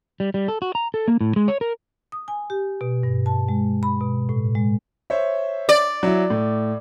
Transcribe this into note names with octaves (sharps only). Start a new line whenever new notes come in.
G3
G3
A4
F#4
A#5
A4
A#3
A2
G#3
C#5
A#4
D#6
G#5
G4
B2
G2
A5
G#3
B5
B2
A2
G#3
C5 C#5 E5
D5
F#3 E4
A2